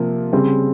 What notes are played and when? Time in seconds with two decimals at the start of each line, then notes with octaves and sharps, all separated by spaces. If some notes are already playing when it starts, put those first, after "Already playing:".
Already playing: C3 F3 A#3
0.33 C#3 G3 C4